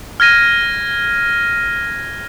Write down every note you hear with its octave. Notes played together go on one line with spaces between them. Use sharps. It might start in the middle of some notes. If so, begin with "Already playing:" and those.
F6 G#6 A#6 D#7